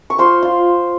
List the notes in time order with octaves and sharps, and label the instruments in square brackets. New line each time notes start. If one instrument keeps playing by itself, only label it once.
[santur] C#6
F4 C5 C6
F4